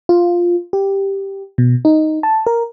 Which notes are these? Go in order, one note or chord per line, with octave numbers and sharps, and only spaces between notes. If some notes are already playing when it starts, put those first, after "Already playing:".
F4
G4
B2
D#4
A5
A#4